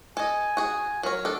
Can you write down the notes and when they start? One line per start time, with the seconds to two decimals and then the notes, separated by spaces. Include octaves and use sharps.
0.17 A4 D#5 G#5
0.57 F#4 G#4
1.03 F#3 A#4 C#5
1.25 D4 A4